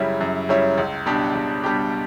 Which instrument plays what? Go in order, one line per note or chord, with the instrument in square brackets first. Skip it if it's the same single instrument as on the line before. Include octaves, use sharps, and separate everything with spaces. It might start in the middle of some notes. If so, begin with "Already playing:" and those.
Already playing: [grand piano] F#2 C#3 G3 C#4 E4
F#2
C#3 G3 C#4 E4
C#2
B2 G3 D4 G4
C#2
B2 G3 D4 G4